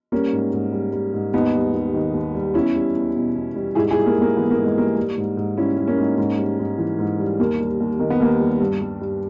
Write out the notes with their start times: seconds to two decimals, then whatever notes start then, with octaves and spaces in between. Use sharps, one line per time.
0.12 G3 A#3 C#4
0.33 G#2
0.53 G#2
0.72 G3
0.92 G3
1.14 G#2
1.33 D#2 B3 D#4
1.54 G3
1.73 D#2
1.94 D#3
2.14 D#2
2.35 G3
2.54 E2 C#4 E4
2.75 G3
2.95 E2
3.15 B2
3.35 E2
3.56 G3
3.75 G#2 E4 G#4
3.91 E4 G#4
3.96 G3
4.06 A#3
4.16 G#2
4.22 A#3
4.37 E3 B3
4.51 A#3
4.56 G#2
4.64 G#3
4.76 G3 A#3
4.98 G3
5.18 G#2
5.37 G#2
5.57 G3 C#4 E4
5.78 G3
5.87 A#3 C#4
5.98 G#2
6.18 G#2
6.38 G3
6.59 G#2
6.78 E3
6.99 G#2
7.20 G3
7.39 D#2 A#3
7.60 G3
7.80 D#2
7.99 D#3 A#3
8.10 B3
8.20 D#2 A#3
8.40 G3
8.60 G2
8.81 G3
9.01 G2